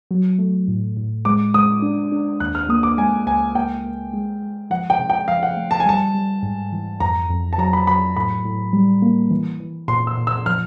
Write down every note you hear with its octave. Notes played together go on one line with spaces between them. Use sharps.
F#3
A3
A2
A2
G#3 D6
G#3 D#6
D4
D4
D#2 F#6
F6
A#3 D#6
D6
G#3 G#5
C#2 G#5
A#3 G5
A#3
G#3
G#3
F3 F#5
G5
C3
G5
F3 F5
F#5
A3
A5
G#5
G3 A5
G3
G#2
E3
F2 A#5
F2
A5
F#3 A#5
B5
F#3 B5
A2 B5
A2
G3
A#3
E3
E3
A#2 C6
E6
A#2
E6
F3 F6